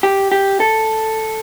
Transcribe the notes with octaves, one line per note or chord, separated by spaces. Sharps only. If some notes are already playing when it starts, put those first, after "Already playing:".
G4
G4
A4